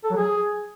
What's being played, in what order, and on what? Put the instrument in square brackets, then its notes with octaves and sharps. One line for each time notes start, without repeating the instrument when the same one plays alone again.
[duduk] A4
F#3
G#4